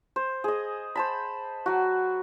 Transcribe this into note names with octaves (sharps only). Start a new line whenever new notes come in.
C5
G#4 D#5
C5 A5 B5
F#3 F#4